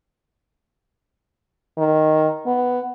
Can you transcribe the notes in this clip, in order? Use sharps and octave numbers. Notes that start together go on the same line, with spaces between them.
D#3
B3